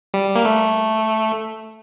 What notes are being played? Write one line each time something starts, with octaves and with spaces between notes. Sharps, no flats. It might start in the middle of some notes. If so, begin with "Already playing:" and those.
G3
A#3
A3